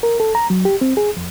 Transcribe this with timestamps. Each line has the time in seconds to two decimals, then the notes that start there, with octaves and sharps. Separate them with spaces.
0.03 A#4
0.20 A4
0.35 A#5
0.50 F#3
0.65 G4
0.81 C4
0.97 G#4
1.17 F2